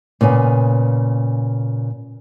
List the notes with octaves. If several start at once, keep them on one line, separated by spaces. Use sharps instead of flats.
A#2 C#3 B3 G#5